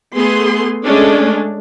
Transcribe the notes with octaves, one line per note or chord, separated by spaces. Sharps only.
A3 B3 G#4 C6
G#3 A3 C#4 D4